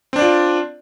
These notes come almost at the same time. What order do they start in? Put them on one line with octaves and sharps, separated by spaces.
C4 D4 D5 F4